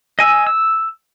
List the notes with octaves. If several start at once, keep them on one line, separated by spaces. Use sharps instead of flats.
D#5 G#5 E6
E6